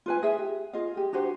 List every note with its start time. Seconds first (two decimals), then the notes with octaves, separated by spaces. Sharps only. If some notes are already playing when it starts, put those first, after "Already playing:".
0.06 F4 B4 G#5
0.22 E4 G#4 E5
0.39 G4
0.73 F4 G#4 D#5 F5
0.95 G4 G#4
1.13 D4 F#4 G4 C5